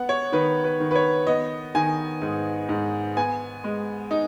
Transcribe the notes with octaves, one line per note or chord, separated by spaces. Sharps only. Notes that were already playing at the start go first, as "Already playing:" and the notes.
Already playing: B3 F#5
C#5
D#3 B4
B4
D#3
B4
C#5
B3 D#5
D#3 G#5
G#2
G#2
B3 G#5
G#3
D#4